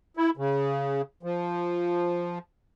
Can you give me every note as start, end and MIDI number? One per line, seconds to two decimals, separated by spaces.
0.17 0.30 64
0.37 1.02 49
1.23 2.39 53